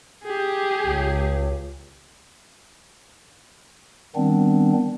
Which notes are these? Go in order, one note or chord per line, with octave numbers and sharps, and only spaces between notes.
G4 G#4
C#2
D#3 G3 B3 C4 D4